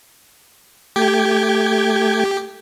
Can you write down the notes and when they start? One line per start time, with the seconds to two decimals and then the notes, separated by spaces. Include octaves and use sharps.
0.96 A3 G4 G5 G#6